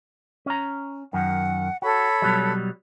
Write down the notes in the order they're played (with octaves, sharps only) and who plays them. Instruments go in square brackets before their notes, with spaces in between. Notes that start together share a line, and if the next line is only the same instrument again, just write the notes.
[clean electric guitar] C#4 A#5
[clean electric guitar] F#2 D#3 [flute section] F#5
[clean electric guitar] F#4 [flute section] A4 C#5 B5
[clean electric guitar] B2 F#3 G3